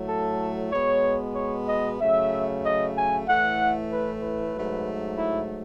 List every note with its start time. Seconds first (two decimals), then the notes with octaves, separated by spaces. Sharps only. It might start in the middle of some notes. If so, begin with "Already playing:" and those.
Already playing: A2 F#3 A3
0.08 A4
0.72 B2 G#3 B3 C#5
1.36 C#5
1.67 D#5
2.00 C#3 F#3 A3 E5
2.64 D#5
2.96 G#5
3.27 A2 E3 A3 F#5
3.91 B4
4.23 B4
4.55 G#2 F#3 A3
5.18 E4